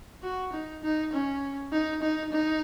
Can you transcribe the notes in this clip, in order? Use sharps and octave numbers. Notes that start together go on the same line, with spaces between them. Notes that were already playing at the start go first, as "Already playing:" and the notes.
F#4
D#4
D#4
C#4
D#4
D#4
D#4